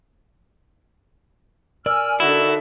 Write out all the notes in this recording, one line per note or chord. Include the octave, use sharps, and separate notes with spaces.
A#4 D5 G#5 E6 F6
D3 D#4 E4 F#4 A4 E5